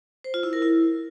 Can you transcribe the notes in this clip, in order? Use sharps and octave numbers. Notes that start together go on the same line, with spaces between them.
C5
F4
E4
A#4
E4